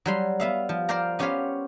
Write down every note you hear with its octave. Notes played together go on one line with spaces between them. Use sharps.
F#3 G3 C6
B3 E5 F5
F3
A#4 C5 D5 F5 G5 A#5
B3 C#4 G4 C5 C#5 F5